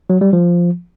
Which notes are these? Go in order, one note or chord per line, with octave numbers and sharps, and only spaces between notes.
F#3
G3
F3